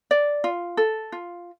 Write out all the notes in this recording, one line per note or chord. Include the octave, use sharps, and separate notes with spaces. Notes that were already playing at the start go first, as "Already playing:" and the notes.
D5
F4
A4
F4